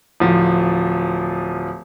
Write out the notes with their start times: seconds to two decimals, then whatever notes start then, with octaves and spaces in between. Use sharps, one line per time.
0.20 D1 F3